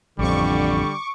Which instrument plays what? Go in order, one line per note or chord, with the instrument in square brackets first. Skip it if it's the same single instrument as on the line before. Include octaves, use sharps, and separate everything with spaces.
[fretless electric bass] A1 F2 [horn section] D3 [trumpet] G3 [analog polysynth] C#6 D6